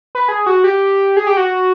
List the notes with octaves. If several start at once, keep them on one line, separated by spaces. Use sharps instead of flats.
B4
G#4
F#4
G4
G#4
G4
F#4